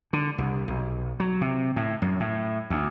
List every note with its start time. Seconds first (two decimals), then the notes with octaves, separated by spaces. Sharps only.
0.13 D3
0.38 C2
0.68 B1
1.20 F#3
1.41 C3
1.76 A2
2.02 F#2
2.20 A2
2.70 D2